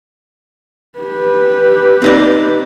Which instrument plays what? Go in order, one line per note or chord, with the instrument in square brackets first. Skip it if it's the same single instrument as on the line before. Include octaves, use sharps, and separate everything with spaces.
[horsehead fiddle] G4 B4
[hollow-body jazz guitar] C4 D#4 D5